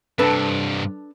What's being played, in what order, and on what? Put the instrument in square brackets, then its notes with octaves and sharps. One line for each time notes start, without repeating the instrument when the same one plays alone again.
[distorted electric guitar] G2 C3 [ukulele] D4 A4 B4